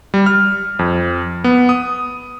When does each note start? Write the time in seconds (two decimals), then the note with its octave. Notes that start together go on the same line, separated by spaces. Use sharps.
0.14 G3
0.26 F6
0.79 F2
1.44 B3
1.69 D#6